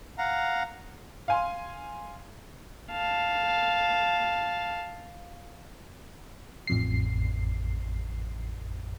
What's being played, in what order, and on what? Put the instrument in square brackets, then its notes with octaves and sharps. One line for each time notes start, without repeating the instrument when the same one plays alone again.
[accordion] F5 F#5 A#5
[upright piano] F5 G#5 C6
[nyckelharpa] F5 A5
[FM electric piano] A1 F2 C7